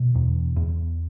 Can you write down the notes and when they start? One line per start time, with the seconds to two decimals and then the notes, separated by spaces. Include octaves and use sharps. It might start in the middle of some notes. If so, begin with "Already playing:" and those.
Already playing: B2
0.15 E2
0.56 E2